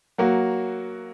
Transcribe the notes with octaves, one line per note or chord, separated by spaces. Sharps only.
F#3 A#3 F#4